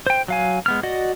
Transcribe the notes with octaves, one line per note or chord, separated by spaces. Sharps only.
C5 G5
F#3 F5 G#5
G#3 B3 F6
F#4 D5 D#5 F#5